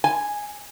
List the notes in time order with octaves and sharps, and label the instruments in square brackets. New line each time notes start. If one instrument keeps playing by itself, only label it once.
[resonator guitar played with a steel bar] G#5